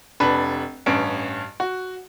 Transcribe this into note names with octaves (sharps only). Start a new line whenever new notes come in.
F1 D4 B4
A1 G2 C#4 D7
F#4